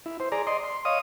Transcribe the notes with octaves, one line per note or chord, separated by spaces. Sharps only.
E4
C5
G#4 D5 A#5
D5 D#5 C6
C6
C#5 D#5 F5 D#6